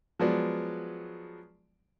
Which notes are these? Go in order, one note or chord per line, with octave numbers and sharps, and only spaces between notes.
F3 F#3 G#3 B3 D5